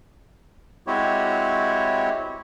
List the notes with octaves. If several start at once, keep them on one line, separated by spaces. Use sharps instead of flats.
G#3 C4 E4 F#4 G4 C#5